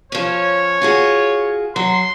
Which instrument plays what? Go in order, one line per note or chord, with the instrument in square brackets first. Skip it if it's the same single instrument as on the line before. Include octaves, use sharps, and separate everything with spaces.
[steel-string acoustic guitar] F3 C#4 [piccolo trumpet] C#5
[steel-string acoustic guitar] F4 F#4 G#4
[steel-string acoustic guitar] F#3 [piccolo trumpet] C6